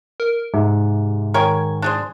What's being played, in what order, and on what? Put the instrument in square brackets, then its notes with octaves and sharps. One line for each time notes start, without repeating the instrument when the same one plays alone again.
[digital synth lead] A#4
[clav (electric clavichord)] G#2 [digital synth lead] C3
[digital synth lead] D#3 [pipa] A#4 C#5 G#5
[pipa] D4 G#4 C5